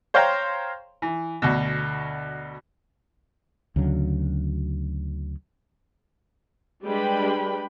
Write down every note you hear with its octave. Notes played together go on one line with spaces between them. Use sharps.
C5 C#5 F5 G5 A#5 C6
E3
D2 B2
D2 C#3 F#3
G3 G#3 D4 B4 G5 B5